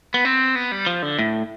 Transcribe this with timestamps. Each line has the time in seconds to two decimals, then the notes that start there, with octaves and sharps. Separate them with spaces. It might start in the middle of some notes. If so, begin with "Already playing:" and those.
0.14 B3
0.25 C4
0.55 B3
0.72 G3
0.87 F3
1.02 D3
1.19 A2